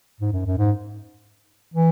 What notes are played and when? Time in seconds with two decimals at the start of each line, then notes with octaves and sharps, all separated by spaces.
0.20 G#2
0.32 F#2
0.46 F#2
0.58 G#2
1.74 E3